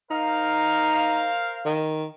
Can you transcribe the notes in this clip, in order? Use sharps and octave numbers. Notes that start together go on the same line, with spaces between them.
D#4 A#4 C5 F5
D#3